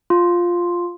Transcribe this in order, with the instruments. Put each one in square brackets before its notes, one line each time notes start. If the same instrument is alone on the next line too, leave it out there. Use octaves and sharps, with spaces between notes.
[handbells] F4